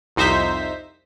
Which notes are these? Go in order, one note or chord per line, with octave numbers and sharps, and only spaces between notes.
C2 F2 D#4 C5 E5 B6